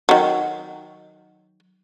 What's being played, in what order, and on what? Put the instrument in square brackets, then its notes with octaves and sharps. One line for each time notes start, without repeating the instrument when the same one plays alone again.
[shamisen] D#3 F#3